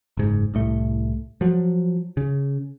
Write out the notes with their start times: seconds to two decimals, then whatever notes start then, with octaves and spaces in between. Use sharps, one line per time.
0.17 F#1 G#2
0.54 C2 A2 A3
1.41 F3 F#3
2.17 C#3